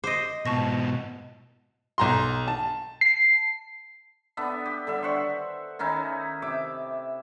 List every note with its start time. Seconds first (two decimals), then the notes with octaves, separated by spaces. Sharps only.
0.04 C5 D#5 D6
0.46 G#2 B2 A5 C#6 A#6
1.98 B1 A#5 C6
2.48 A5
3.01 C7
4.37 B3 D4 A4 E5
4.65 G4
4.87 D3 G3 E5
5.03 C5 F#5 C#6
5.79 D#3 C#4 D#4 E4
6.42 C3 E5 D6